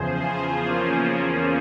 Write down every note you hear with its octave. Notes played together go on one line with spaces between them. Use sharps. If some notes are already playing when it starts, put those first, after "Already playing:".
Already playing: E2 C#3 F3 G#4 C5
F4 G#4
A#3 C#4